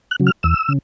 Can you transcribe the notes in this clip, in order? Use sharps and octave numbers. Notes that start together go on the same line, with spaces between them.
F#6
C#3 F#3
F6
E2 E6
C#3